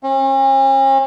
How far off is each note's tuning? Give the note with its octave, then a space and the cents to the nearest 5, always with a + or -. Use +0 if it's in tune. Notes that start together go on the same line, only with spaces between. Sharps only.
C#4 -45